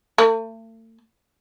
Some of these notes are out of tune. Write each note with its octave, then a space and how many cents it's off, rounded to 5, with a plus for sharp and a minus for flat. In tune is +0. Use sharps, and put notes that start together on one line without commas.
A3 +40